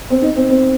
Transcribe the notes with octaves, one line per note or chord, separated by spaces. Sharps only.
C4
D#4
C4
C4